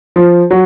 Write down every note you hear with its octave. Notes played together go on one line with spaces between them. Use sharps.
F3
F#3